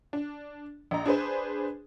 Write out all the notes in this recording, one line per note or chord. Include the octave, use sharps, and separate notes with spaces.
D4
A#1 D#5 A#5
D4 G#4 B4 C5